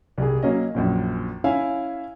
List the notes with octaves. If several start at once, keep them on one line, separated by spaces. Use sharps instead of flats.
C2 G3 G#4
F#3 A#3 C#4 D#5
A#1 F#2 A#2
C#4 E4 E5 F5 G#5